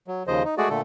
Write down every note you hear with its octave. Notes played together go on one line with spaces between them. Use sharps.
F#3
D#2 C#3 F3 C5 D#5
D#4
G#3 A3 F#4 G#4 D5
A#2 D3 A3 A4